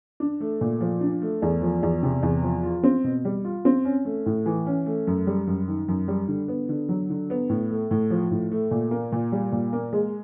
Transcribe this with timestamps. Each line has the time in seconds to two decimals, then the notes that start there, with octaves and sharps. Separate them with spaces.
0.20 D4
0.40 A3
0.61 A#2
0.80 F3
1.01 D4
1.22 A3
1.42 E2
1.62 F3
1.83 E2
2.03 C3
2.23 E2
2.43 F3
2.63 F4
2.83 C4
3.04 B2
3.25 G3
3.45 F4
3.65 C4
3.85 C#4
4.05 A3
4.26 A2
4.46 E3
4.66 C#4
4.86 A3
5.07 F#2
5.27 G3
5.47 F#2
5.68 D#3
5.88 F#2
6.08 G3
6.28 D3
6.48 B3
6.69 D3
6.89 F#3
7.10 D3
7.30 B3
7.49 A2
7.70 A3
7.91 A2
8.10 F3
8.31 A2
8.51 A3
8.71 A#2
8.91 A#3
9.12 A#2
9.32 G3
9.52 A#2
9.73 A#3
9.93 G#3